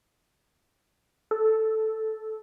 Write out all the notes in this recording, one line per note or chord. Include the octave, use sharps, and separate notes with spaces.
A4